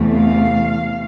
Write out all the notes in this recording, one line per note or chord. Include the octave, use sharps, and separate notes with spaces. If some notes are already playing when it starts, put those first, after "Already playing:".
Already playing: E2 C3 E3 A3
F5